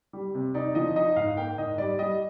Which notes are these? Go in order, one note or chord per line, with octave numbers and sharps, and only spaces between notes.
G3
C3
D#4 D5
F3 D#5
D#4 D#5
G#2 F5
A#3 G5
G#2 D#5
G3 D5
G3 D#5